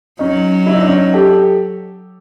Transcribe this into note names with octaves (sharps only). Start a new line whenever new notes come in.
F#3 C#4 D#4
E4
D#4
D4
C#4 D#4
G4 A4